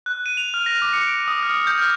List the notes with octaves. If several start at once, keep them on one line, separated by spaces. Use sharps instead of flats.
F#6
D#7
F7
F6
A#6
D6
C#7
D7
D#6
F6
G6
F6